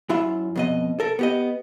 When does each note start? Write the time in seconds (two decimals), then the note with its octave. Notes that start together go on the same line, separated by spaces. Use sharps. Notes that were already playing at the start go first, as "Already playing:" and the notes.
0.09 F#2 F#3 E4 F4 E5
0.56 F2 B2 D#5
1.00 A4 A#4
1.19 B3 G4 D#5